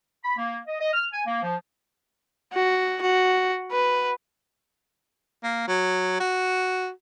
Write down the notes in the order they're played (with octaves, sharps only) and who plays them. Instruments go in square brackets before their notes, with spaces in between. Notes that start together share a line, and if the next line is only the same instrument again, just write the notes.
[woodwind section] B5
A#3
D#5
D#5
F6
G#5
A#3
F3
[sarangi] F#4
F#4
B4
[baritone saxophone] A#3
F#3
F#4